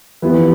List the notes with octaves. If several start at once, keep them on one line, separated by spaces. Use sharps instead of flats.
E3 F3 B3 E4 G4 B4